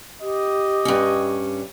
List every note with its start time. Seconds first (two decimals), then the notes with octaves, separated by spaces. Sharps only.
0.22 G4 D#5
0.85 G2 C#4